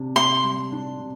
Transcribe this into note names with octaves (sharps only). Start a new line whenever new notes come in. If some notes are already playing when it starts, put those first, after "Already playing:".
Already playing: C3 D4
C3 C6
G3
D4
C3